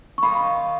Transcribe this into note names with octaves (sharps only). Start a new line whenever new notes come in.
C#6
D#3 A#3 F4 B5